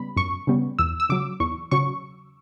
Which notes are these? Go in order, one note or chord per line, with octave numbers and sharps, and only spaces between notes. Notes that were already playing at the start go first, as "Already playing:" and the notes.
Already playing: C#3 G3 B3 B5
F#2 C#6
C#3 G3 B3
E2 E6
E6
C#3 F#3 D6
E2 C#6
C#3 F#3 C#6